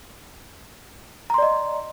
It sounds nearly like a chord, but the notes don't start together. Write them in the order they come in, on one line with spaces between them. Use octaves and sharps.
A#5 C6 D5 D#5